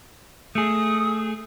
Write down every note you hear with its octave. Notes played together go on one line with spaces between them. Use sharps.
A3 G#4 D#6